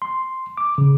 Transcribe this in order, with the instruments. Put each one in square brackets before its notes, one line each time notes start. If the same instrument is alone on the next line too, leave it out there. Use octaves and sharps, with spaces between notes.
[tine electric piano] C6
D6
C#3